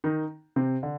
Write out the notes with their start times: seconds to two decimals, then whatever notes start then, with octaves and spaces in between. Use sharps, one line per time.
0.04 D#3 D#4
0.56 C3 C4
0.83 D3